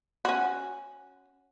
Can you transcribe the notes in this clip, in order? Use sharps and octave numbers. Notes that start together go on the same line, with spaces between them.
C#4 F#4